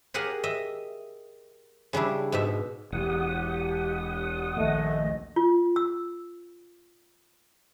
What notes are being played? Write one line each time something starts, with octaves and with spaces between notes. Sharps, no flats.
G4 G#4 A#4 F5 F#5 G#5
D#5 E5
C#3 G3 D4 E4
G#2 B2 E5
E1 G4 F#5 D#6
A#1 D#2 A3 D#5
F4
E6